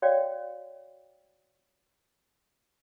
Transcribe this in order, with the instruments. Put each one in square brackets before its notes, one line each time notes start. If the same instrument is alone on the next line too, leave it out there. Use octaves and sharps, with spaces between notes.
[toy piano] F#4 C#5 D5 F5 G5